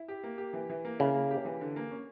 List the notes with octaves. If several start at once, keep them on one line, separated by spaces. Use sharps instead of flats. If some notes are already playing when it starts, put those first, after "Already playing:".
Already playing: E4
G4
A#3
G4
E3
E3
A#3
C#3 E4
A#3
G4
E3
D3
A#3
C#4